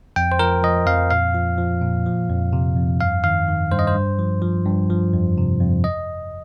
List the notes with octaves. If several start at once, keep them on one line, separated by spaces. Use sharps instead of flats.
F2 G5
C5
F3 A#4
F3 D#5
F2 F5
A#2 F5
F3
F3
A#2
F3
F2
C3
F2
G2 F5
D#3 F5
D#3
G2 C5
D#5
C5
G2
F3
F3
G2
F3
F2
C3
F2
D#5